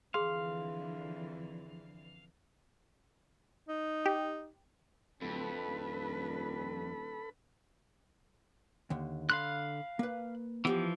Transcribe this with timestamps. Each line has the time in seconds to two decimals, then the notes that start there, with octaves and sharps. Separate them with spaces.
0.14 F2 D3 E3 G#4 F5 C6
3.69 D#4
4.06 G4
5.22 D1 F2 D4 A4 B4 B5
5.66 D#1
8.90 D#2 D3
9.30 D3 F5 B5 C6 F#6
9.99 A#3 B4
10.65 E3 F3 B3 G4 C5